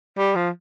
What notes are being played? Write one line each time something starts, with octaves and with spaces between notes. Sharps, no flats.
G3
F3